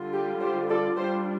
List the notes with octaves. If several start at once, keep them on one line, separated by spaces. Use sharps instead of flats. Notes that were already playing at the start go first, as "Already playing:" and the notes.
Already playing: D3 G3 F4
G4
G4 C5
A4 D5
G3 D4 F4 G4 C5